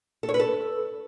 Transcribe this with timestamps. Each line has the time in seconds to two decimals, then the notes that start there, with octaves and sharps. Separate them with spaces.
0.23 A4
0.29 C#5
0.34 B4
0.40 A4